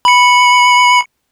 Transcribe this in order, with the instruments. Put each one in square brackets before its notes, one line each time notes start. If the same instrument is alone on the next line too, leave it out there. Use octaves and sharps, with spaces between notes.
[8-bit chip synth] B5 C#7